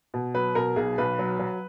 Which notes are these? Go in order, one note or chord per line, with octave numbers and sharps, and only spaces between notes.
B2
F#3 B4
B2 A#4
B1 G#4
B1 B4
F#3
F#3